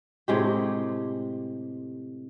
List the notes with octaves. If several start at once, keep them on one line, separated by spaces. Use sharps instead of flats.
A2 C3 G#3 G4